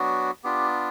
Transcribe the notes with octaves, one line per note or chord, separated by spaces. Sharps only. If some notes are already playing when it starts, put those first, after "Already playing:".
Already playing: F#3 B3 D4 F#4
B3 D4 F4 G4